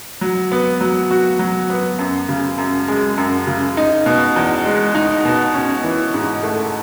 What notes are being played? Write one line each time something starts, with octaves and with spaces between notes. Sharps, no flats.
F#3
B3
F#3
F#4
F#3
B3
F#2
C#3
F#2
G#3
F#2
C#3
D#4
B2
E2
G#3
D#4
B2
C#4
E3
G#2
A3